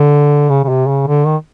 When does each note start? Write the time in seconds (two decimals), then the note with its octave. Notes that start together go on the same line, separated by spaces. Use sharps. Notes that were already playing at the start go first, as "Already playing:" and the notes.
Already playing: D3
0.49 C#3
0.64 C#3
0.69 C3
0.88 C#3
1.07 D3
1.27 D#3